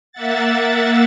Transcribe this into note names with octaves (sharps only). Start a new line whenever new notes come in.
A#3 E5 F#5 A6